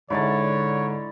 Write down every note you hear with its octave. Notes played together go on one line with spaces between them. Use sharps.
G#2 D3 E4 C#5 D5 A5